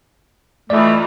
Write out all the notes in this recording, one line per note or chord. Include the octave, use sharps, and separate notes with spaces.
E3 A3 D#4 F4 D5